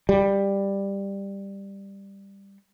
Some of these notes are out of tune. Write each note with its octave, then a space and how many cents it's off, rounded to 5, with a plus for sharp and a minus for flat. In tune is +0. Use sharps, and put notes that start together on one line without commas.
G3 +10